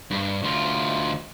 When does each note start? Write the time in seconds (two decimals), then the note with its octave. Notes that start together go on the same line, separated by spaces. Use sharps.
0.11 G2
0.42 D2 F4